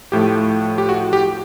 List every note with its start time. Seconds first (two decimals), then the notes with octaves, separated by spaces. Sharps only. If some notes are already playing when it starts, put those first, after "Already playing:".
0.12 A2 F3 A3 G4
0.78 G4
0.89 F#4
1.13 G4